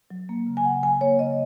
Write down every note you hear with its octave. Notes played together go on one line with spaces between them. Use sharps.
F#3
A#3
C#3
G#5
C#3 F#5
F#3 G#5
A#3 C#5
C#3 D#5